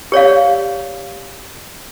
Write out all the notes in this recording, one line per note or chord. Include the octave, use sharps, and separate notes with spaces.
G4 C#5 D5 F5